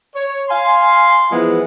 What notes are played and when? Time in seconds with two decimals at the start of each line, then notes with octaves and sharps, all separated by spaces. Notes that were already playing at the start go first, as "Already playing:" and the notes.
0.14 C#5
0.49 F5 G#5 C6
1.31 E3 F3 G#3 B3 E4 G#4